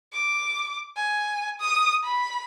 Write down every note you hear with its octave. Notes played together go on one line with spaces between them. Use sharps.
D6
G#5
D#6
B5